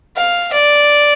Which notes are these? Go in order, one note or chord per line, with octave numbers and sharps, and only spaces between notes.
F5
D5